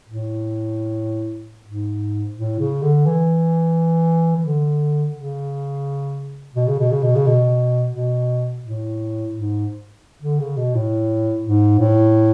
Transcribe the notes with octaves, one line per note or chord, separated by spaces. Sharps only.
A2
G#2
A2
C#3
D3
E3
E3
D3
C#3
B2
C#3
B2
C#3
B2
C#3
B2
B2
A2
G#2
D3
C#3
B2
A2
G#2
A2